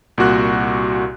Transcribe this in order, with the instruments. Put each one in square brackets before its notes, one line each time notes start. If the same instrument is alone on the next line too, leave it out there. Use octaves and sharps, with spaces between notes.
[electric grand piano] C2 A#2 F#4 F#6